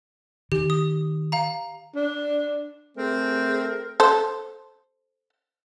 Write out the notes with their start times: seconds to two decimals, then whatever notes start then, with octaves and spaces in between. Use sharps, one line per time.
0.52 D#3 G4
0.70 D#6
1.32 F5 A#5
1.95 D4
2.97 A3 C4 G#4 A#4
4.00 A4 C5